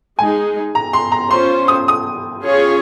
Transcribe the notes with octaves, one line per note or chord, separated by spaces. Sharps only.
G#3 D#4 G#4 G#5
A#5
C6
A#5
C#4 F4 C5 C6
D#6
D#6
C#4 F4 G#4 C#5